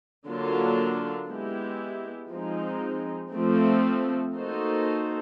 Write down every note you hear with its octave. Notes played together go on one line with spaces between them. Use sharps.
D3 F#3 A#3 D4 F4
G#3 B3 E4 G4
F3 G#3 C4 D#4
F3 A3 C4
A#3 D#4 F#4 A4 C5